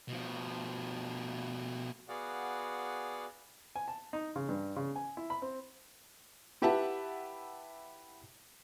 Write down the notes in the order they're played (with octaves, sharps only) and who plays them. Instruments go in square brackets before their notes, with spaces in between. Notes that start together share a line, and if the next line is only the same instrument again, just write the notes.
[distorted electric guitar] B2 F3
[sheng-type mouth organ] B3 F#4 G#4 D5 F5 F#5
[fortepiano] G#5
A5
D#4
C#3
G2
C#3
G#5
E4
B5
C4
[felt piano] E4 G4 B4 E5 F#5 A5